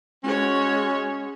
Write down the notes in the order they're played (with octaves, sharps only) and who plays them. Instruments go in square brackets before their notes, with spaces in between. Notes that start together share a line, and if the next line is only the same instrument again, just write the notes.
[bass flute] G#3 [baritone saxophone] C#4 [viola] F#4 C#5